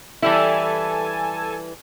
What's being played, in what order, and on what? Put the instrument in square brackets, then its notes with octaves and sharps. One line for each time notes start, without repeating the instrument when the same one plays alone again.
[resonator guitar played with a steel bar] E3 G3 E4 [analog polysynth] A4 G#5 A5